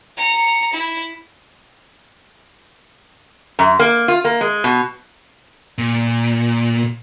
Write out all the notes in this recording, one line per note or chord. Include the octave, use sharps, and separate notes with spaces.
A#5 C#7
E4
F#2
A#3
F4
A#3
G#3
B2
A#2